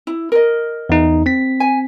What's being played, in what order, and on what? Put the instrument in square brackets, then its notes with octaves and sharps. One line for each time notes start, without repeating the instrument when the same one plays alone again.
[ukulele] E4
A#4 D#5
[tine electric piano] E2 D#4
C4 B6
[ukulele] G#5